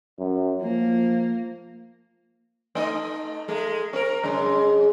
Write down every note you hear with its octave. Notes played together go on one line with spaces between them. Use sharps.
F#2
F3 A#3
A3 D#4 D#5
G#3 A3
C4 A#4
F#2 C#3 G#3